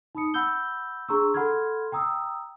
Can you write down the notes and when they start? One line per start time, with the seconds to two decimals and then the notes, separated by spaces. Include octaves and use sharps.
0.15 D#4 B5 D#6 C#7
0.34 F#5 B5 E6 G6 G7
1.08 D4 G#4 A#5 C6 C#6 E6
1.34 A4 F#5 B5 C6 F6 G#6
1.92 G5 A#5 D#6 E6